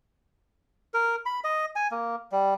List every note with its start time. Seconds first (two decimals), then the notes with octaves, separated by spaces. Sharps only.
0.94 A#4
1.26 B5
1.44 D#5
1.76 G#5
1.91 A#3
2.32 G3